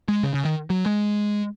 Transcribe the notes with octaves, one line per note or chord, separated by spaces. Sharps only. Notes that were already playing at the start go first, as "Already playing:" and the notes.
G#3
C#3
C#3
D#3
F#3
G#3